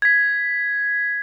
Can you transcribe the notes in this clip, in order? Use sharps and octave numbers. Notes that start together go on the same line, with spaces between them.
G#6 B6